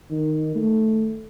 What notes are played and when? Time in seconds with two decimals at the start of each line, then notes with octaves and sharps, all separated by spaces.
0.11 D#3
0.55 A3